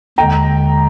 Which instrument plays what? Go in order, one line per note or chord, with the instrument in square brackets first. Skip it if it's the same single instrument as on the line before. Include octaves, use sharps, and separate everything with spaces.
[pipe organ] D#2 D3 G#3 [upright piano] G5 A#5